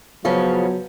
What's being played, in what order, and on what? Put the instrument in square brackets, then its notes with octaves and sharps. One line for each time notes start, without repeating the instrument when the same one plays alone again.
[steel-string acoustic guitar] C#3 F3 C#4 [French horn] F#3 [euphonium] B3